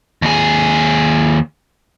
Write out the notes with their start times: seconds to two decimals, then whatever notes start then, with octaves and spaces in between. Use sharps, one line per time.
0.22 D#2 G#4